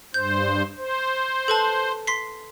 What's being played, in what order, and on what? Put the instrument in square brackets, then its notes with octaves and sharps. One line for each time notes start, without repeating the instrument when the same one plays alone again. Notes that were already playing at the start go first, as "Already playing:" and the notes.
[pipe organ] G2 C5 [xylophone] G6
[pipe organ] C5
[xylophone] A4 B4 A5
C6 B6 C7